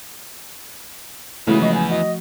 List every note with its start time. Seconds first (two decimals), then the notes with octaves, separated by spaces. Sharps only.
1.48 C#3 E3 F#3 G#3 A3 B3 E4
1.62 F3 D#5
1.75 G#5
1.90 F#4 D#5